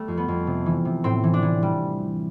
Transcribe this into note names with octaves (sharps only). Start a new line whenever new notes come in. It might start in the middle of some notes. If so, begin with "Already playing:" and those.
Already playing: G3 A3
F2
B3
F2
C3
E3
C3
A2 C4
E3
D4
E3
G3